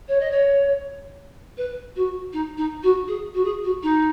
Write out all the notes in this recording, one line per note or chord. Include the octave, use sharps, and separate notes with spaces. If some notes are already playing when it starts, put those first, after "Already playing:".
C#5
D#5
C#5
B4
F#4
D#4
D#4
F#4
G#4
F#4
G#4
F#4
D#4